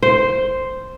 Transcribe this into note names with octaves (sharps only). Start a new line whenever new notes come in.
C5